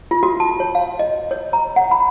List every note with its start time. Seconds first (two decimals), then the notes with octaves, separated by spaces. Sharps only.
0.11 F4
0.23 F#4
0.40 A5
0.60 C#5
0.75 F5
0.99 D#5
1.31 C#5
1.53 A#5
1.76 F#5
1.91 B5